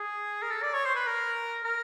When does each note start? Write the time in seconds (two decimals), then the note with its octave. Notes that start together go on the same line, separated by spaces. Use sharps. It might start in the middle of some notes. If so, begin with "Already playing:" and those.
Already playing: G#4
0.42 A#4
0.50 A4
0.63 D5
0.74 C#5
0.85 C5
0.96 B4
1.07 A#4
1.63 A#4